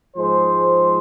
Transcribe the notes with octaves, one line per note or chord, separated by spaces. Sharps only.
G#2 F3 G#3 C5